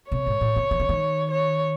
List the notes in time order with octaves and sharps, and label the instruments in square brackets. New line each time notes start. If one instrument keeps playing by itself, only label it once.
[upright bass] C3 [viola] C#5
[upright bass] G#2
A2
C3
D#3
C#3
D#3
[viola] C#5